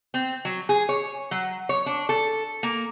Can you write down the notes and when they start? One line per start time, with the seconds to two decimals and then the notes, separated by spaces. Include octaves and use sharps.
0.14 C4
0.45 F#3
0.69 G#4
0.89 C#5
1.31 F#3
1.69 C#5
1.86 D4
2.09 A4
2.63 A#3